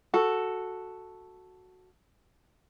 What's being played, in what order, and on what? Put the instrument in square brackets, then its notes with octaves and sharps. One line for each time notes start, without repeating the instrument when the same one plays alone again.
[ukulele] F#4 A4